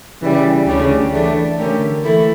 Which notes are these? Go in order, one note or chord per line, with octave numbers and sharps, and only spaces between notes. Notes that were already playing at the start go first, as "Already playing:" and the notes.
C#3 E3 G3
D2 C#3 G3 D4
E3 A3 D4
D3 A3 C#4 G4 A#4
E3 A3 E4 A4